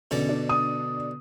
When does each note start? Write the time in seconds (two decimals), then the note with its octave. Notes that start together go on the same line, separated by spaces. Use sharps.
0.11 E2 B2 D3 C#4 D5
0.29 D4
0.49 D#6